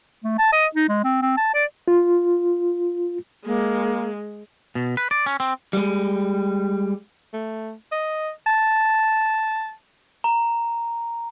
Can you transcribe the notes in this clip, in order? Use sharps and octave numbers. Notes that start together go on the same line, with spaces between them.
A3
A5
D#5
D#4
G#3
C4
C4
A5
D5
F4
G#3 A#3
B2
B4
D5
C#4
C4
G3 G#3
A3
D#5
A5
A#5